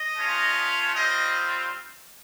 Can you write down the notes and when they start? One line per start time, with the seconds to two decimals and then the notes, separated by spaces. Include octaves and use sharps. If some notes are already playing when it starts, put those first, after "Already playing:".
Already playing: D#5
0.16 A3 C#4 F4
0.93 G3 C4 F4 D#5